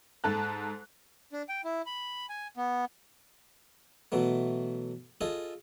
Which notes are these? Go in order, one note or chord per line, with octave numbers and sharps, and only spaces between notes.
G#2 A4 A5 F#6
D4
G5
E4
B5
G#5
B3
B2 E3 F#3 A3
F4 G#4 A4 D#5